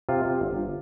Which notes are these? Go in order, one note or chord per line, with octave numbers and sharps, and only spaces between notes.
C3 F4
C3
G1